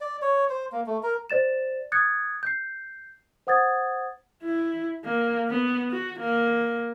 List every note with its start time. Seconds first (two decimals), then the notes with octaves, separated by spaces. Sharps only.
0.01 D5
0.22 C#5
0.49 C5
0.72 A#3
0.86 A3
1.03 A#4
1.30 C5 D5 A6 E7
1.92 D#6 F#6 G#6 A6 C#7
2.43 G6 C7
3.47 C5 F#5 D#6 G#6 A6
4.44 E4
5.05 A#3
5.50 B3
5.91 F#4
6.20 A#3